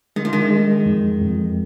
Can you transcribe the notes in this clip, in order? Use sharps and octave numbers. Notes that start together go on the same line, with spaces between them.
D#3 G#3
F3
D#3
G#3
F2
F2